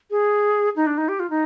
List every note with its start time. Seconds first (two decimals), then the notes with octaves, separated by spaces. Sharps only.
0.11 G#4
0.76 D#4
0.87 D4
0.98 D#4
1.09 G4
1.20 F4
1.30 D#4